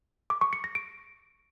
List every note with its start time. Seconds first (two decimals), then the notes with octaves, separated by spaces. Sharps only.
0.30 D6
0.41 C#6
0.53 C#7
0.64 A#6
0.75 D7